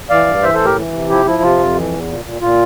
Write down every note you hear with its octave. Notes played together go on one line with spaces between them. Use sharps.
E3 D5 F5
G2
E3 C5 E5
A4 C5
A2
G4 A#4
E3
C3
F3 E4 G4
F3 E4
C3 F4
F2
E3
E2
A#2
A#2
A#2 F4